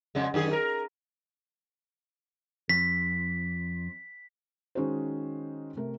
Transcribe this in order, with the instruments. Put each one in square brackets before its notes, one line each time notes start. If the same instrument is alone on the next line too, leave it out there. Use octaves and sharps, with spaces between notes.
[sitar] F2 C#3 G#3
F#2 D#3 G#4
A#4
[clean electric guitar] F2 [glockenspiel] B6
[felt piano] D#3 G#3 C#4 D#4 F#4 C5
C3 A3 A#4